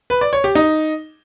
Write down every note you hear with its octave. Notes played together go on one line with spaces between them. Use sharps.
B4
D5
C#5
G4
D#4